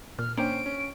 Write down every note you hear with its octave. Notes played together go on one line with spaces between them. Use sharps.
A#2 F6
A#3 C#4 D4 C5 G5 D7
C#4